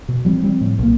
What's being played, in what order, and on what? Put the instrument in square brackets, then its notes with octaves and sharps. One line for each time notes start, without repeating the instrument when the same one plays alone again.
[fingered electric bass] B2
F3 G3 C4
F3 G3 C4
A2
B1 A#3